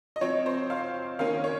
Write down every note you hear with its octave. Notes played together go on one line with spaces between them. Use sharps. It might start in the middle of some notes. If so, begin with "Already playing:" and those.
D#5
F3 C4 C#5
C5
F5
D#3 A#3 C#4 F5
C#5